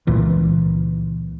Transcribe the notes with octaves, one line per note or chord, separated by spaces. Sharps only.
C#2 A#2 E3